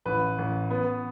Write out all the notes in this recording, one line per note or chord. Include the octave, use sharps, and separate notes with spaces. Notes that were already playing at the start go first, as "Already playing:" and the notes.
A1 B4
A1
B3